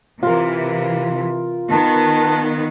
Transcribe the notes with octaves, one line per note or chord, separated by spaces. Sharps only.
C3 E3 F4 A#4
D#3 B3 A5